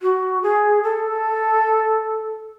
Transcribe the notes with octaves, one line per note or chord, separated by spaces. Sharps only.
F#4
G#4
A4